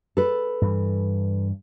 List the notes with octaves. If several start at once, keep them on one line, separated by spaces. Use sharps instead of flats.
A4 B4
G2 E3